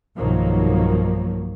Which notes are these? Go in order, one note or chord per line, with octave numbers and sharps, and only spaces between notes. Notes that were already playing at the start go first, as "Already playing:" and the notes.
B1 G2 D#3 F3 F#3 A#3